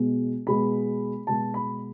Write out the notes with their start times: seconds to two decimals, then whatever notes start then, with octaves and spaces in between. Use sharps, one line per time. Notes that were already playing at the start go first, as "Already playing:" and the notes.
Already playing: B2 G#3 B3
0.47 B2 G#3 B3 B5
1.27 B2 G#3 B3 A5
1.54 B5